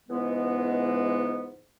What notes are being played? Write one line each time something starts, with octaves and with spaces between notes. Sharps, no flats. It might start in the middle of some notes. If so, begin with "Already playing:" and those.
C#2 G#2 E3 G#3 B3